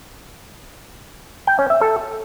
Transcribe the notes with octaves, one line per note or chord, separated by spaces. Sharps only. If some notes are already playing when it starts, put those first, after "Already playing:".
G5
C#4
E5
A4